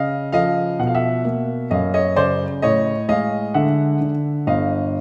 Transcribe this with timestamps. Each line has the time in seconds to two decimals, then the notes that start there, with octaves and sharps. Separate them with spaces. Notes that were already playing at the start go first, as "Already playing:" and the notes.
Already playing: C#3 D#5 F5
0.32 F3 D#5 F5
0.79 B2 F#5
0.87 F5
0.95 E5 F#5
1.25 A#3
1.71 F#2 D#5 F5
1.94 C#5 D#5
2.16 C#3 C5 D5
2.62 A2 C#5 D#5
3.09 G#3 D#5 F5
3.54 D3 E5 F#5
4.01 D3
4.47 G1 D#5 F5